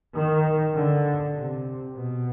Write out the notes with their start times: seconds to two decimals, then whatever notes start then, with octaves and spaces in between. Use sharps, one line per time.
0.14 D#3
0.75 D3
1.35 C3
1.96 B2